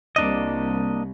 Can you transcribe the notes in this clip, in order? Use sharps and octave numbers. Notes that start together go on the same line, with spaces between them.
C2 A#3 D4 D#5